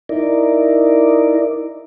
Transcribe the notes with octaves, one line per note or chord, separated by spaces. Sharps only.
D#4 E4 A#4 D5